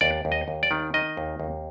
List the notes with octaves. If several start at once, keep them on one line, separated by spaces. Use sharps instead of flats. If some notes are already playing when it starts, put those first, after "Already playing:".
D#2 D5
D#2
D#5
D#2
D5
D#3
D#3 D#5
D#2
D#2